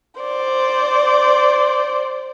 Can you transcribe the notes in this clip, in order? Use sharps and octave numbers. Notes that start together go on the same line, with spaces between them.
C5 D5